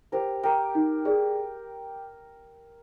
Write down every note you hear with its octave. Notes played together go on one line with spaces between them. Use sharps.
G4 A#4 C5
G4 A#4 G5 A#5
D#4
G#4 D5